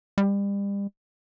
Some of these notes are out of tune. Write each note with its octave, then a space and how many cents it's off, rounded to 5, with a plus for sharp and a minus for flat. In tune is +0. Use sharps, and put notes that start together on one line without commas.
G3 +35